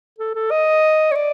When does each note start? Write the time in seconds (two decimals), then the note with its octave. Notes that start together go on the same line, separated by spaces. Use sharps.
0.19 A4
0.35 A4
0.51 D#5
1.11 C#5
1.15 D5